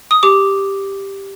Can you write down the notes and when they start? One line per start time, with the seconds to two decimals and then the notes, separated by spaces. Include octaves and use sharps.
0.11 D#6
0.23 G4 D6